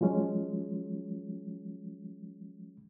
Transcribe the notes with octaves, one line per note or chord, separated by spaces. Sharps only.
F3 F#3 G#3 C#4